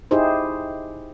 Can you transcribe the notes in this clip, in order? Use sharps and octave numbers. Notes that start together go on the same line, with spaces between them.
D#4 E4 G4 G#4 C5